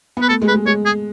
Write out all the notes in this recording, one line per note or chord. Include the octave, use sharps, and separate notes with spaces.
B3 B4
A3 A4
G#3
B4
G#3
G#3 C#5
G#4